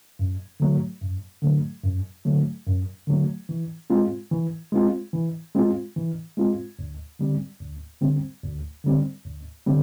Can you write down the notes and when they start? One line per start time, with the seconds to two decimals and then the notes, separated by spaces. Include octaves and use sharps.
0.19 F#2
0.60 D3 F#3 A3
1.01 F#2
1.42 D3 F#3 A3
1.84 F#2
2.25 D3 F#3 A3
2.67 F#2
3.07 D3 F#3 A3
3.49 E3
3.90 G#3 C4 F4
4.31 E3
4.72 G#3 C4 F4
5.13 E3
5.55 G#3 C4 F4
5.96 E3
6.37 G#3 C4 F4
6.79 D2
7.19 D3 G3 C4
7.60 D2
8.01 D3 G3 C4
8.43 D2
8.84 D3 G3 C4
9.25 D2
9.66 D3 G3 C4